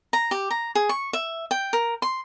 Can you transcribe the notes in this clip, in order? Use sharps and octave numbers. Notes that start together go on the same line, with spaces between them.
A#5
G4
A#5
G#4
C#6
E5
G5
A#4
C6